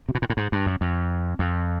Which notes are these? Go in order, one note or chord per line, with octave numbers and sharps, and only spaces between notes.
C3
B2
A#2
A2
G#2
G2
F#2
F2
F2